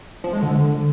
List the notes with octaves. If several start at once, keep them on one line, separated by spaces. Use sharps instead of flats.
F3
G#3
D3